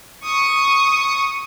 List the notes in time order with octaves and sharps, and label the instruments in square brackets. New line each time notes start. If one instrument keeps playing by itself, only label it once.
[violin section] C#6 D#6